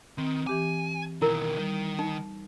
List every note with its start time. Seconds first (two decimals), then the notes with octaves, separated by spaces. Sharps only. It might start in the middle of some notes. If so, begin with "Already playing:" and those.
0.18 D#3 C4
0.47 E3 G4 G#5 D6
1.22 B2 D#3 E4 A#4
1.58 D#3 G3
1.99 D#4